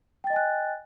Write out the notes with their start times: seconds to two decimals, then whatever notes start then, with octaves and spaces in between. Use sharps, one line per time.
0.24 G5
0.27 A6
0.30 D#5
0.33 G#5
0.36 F#6